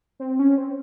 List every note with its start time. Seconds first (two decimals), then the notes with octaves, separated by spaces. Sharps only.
0.20 C4
0.39 C#4
0.58 C4